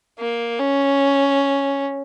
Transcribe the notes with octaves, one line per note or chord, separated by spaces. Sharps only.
A#3
C#4